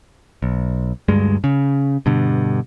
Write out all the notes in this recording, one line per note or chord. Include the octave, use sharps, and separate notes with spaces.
B1
D2 G2 G#3
C#3
G2 B2 D3